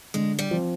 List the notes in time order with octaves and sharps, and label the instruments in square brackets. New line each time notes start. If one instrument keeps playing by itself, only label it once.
[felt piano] D3 [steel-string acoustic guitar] G#3
[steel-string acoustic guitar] G3
[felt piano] F3 C4